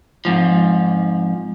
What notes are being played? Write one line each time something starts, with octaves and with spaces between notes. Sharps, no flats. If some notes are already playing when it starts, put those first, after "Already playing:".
F2 G#2 F3